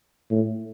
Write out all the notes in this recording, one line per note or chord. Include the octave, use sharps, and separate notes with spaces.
A2